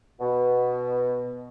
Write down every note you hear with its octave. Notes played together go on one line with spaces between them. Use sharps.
B2